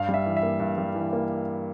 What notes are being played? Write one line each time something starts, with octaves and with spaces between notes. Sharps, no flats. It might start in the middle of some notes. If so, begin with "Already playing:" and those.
Already playing: G2 F5
G3
E5
E3
E5
A#3
G2
G3
E3
A#3